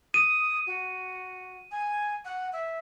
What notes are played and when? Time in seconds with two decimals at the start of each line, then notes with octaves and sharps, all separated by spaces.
0.14 D#6 D#7
0.67 F#4
1.71 G#5
2.25 F#5
2.53 E5